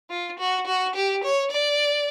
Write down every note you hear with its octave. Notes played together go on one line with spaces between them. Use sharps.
F4
F#4
F#4
G4
C#5
D5